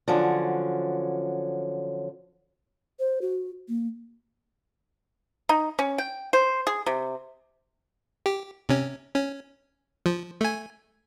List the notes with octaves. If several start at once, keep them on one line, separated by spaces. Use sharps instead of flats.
D3 F3 F#3 C#4
C5
F#4
A#3
D#4
C#4
G5
C5
G#4
C3
G4
C3 C#4
C#4
F3
A3 G#5